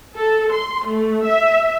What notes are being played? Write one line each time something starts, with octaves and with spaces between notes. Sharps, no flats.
A4
C6
A3
E5